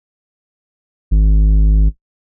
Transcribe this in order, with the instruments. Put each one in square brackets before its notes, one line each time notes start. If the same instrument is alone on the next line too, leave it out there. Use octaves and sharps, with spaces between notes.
[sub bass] G#1